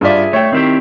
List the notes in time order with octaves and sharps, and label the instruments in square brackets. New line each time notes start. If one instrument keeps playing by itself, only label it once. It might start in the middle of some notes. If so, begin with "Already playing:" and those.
[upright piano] G2 F4 D5 [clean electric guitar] G#4 E5
[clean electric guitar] A3 [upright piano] C#5 E5 G5
[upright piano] D#3 [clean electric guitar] C4 E4 G4